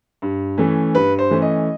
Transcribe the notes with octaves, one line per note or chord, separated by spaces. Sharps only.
G2
E3 A3 C#4
G2 B4
C5
E3 A3 C#4
D#5